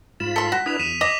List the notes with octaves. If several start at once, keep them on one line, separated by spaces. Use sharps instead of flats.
G#2 F4 B5 E7
A4 C6 B6
F#4
D4 E4 B4 D#6 F7
E2 B6 D#7 E7
D#5 D6 B6 F7